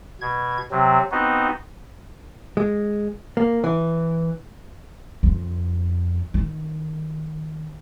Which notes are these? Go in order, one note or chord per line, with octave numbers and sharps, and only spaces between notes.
B2 G#6
C3 F#3 C4
B3 C4 D#4 F#4
G#3
A#3
E3
F2
D#3